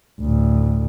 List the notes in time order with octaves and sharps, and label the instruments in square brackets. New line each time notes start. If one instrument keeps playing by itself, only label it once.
[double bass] D2 A2